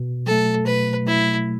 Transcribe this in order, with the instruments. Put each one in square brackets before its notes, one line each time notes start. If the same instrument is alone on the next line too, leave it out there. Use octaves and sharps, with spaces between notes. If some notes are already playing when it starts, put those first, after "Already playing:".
Already playing: [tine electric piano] B2
[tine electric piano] F#3 A3 [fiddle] A4
[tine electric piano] B2 [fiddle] B4
[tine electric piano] F#3 A3 [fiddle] E4